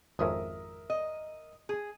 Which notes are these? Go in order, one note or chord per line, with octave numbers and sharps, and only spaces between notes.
G#1 F2 C#4 A#4 E5 D#6
D#5
G#4